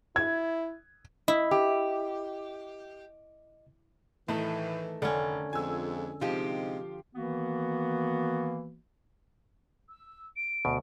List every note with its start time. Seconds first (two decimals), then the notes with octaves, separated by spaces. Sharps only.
0.16 E4 G#6
1.28 E4 D#5
1.51 G4
4.28 A2 D#3 E3 A3
5.02 F1 D3 C#4
5.53 F2 G#3 F4 G#5 E6
6.21 C3 F3 G#3 D#4 F4 G4
7.14 D#3 E3 A#3 B3 F#4
9.89 E6
10.36 D7
10.65 D2 B2